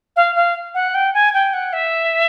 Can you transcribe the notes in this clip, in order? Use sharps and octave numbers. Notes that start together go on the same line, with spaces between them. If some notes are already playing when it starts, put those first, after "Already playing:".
F5
F5
F#5
G5
G#5
G5
F#5
E5